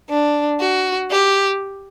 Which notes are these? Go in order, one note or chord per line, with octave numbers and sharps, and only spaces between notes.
D4
F#4
G4